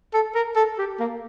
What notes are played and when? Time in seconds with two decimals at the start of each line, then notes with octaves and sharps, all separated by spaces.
0.14 A4
0.35 A#4
0.56 A4
0.78 G4
1.00 A#3